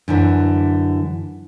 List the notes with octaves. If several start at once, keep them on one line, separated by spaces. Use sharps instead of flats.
F#2 D3 E3